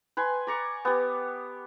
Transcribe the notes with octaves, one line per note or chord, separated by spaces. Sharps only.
B4 G5 G#5 C6
D5 A#5 C#6
B3 G4